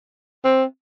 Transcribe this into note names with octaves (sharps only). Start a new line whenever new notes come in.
C4